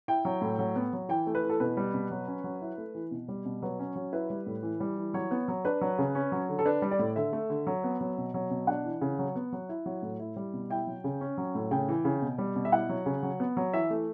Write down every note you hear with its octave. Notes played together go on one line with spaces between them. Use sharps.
E4 G5
F#3
A2
F#3
B3
F#3
E3 G5
A3
B4
E3
A4
B2 B4
G3
B2
F#3
C#4
F#3
E4
A3
E3
B2
G3
B2
F#3 B4
C#4
F#3
E4 B4
G3
A2
E3
G3
E3
F#3 C#5
B3
F#3
D4 B4
F#3
C#3
C#4
F#3
D3
A4
D4 B4
G3
D5
A2
D3 E5
A3
D3
F#3
B3
F#3
B2
F#3
B2
D4 F#5
E3
C#3
F#3
B3
F#3
E4
F#3
A2
E4
G3
B2
E4 G5
F#3
C#3
C#4
F#3
A2
C#3 G5
E3
C#3
B2
G3
B2
E5
E4 F#5
F#3
C#3
F#3
B3
F#3
E3 E5
A3